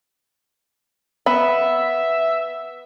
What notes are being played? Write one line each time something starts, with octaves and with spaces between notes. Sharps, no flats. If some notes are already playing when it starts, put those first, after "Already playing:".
B3 E5 B5